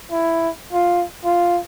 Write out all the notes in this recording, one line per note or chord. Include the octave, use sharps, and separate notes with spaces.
E4
F4
F4